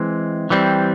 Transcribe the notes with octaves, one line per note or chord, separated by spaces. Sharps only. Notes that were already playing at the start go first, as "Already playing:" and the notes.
Already playing: E3 G#3 C4
E3 G3 C4